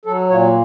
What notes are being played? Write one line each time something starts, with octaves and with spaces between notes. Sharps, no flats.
F#3 A4
A#2 C#5